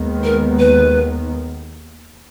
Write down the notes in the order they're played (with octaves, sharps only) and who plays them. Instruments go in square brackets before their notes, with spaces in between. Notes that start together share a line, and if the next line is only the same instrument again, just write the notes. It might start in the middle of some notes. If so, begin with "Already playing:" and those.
Already playing: [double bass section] D#2 D#3 G#3 B3
[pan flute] A#4
B4